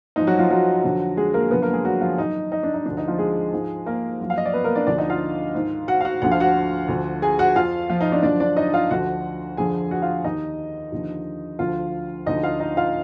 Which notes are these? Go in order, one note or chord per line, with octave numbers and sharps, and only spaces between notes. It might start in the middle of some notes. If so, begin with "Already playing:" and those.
G#2 F3 D#4
F#3 F#4
F3 F4
F#3 F#4
F2 D3 F3
G#3 G#4
A#3 A#4
F#2 D3 F3 B3 B4
A#3 A#4
G#3 G#4
F#3 F#4
F3 F4
F#2 D#3 D#4
D#4
D4
D#4
D2 D3 F3 D4
D#4
F3 F4
G#3 G#4
G#2 F3
A#3 A#4
F#2 F3
F5
D#5
D5
B3 B4
A#3 A#4
D4 D5
D2 D3 F3 D4 D5
D#4 D#5
F4 F5
G#2 D#3
F#4 F#5
F5
F#4 F#5
D2 D3 F3 F#5
F5
F#4 F#5
D2 D3 F3
G#4 G#5
F#4 F#5
F2 F3 F4 F5
F3 F4
D#4
D4 D5
F#2 D3 F3 D4 D5
D4 D5
D#4 D#5
F4 F5
D2 D3 F3 F#4 F#5
F2 D3 F3 G#4 G#5
F#4 F#5
F4 F5
D#2 D#3 D#4 D#5
D#2 D3 F3
D2 D3 F3 F4 F5
D2 D3 F3 D#4 D#5
F4 F5
D#4 D#5
F4 F5